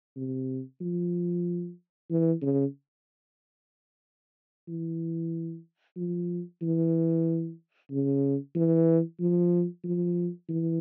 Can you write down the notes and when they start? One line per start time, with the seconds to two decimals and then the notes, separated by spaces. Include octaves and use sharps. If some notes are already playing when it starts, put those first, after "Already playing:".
0.17 C3
0.81 F3
2.10 E3
2.42 C#3
4.68 E3
5.97 F3
6.62 E3
7.91 C#3
8.55 E3
9.20 F3
9.84 F3
10.49 E3